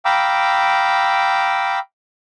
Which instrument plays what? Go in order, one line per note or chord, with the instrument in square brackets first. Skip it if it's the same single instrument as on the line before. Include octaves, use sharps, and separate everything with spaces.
[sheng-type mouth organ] F5 G5 A#5 B5 D6 E6